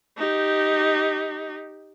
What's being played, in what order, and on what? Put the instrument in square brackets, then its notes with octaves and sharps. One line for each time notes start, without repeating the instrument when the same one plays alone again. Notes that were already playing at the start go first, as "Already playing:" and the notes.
[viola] D#4 G4